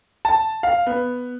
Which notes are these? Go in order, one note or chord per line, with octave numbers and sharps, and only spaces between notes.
A5
F5
B3